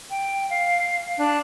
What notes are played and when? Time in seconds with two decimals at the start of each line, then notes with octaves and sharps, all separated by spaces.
0.10 G5
0.51 F5
1.17 D4 F#6